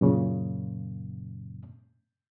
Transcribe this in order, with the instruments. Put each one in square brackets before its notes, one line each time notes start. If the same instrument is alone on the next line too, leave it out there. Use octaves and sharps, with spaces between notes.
[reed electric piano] F#2 A#2 C#3